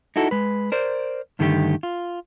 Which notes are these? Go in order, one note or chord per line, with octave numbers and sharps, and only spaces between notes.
D#4 E4 F#4 A4
G#3 B4
A#4 C5 D5
G2 D3 D#3 A3 F#4 G4
F4